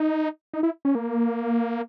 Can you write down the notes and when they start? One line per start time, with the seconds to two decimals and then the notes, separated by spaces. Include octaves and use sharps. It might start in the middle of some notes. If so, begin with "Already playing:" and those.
Already playing: D#4
0.53 D#4
0.63 E4
0.85 C#4
0.95 A#3